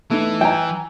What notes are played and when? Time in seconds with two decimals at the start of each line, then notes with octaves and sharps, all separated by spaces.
0.10 E3 A3 D#4
0.41 G5 G#5 A#5